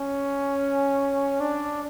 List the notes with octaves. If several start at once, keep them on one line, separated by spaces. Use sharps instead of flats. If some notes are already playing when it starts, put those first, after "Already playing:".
Already playing: C#4
D4